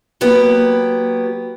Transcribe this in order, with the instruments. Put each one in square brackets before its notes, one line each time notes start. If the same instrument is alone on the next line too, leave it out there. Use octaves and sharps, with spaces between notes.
[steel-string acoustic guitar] F#3 A#3 B3 G4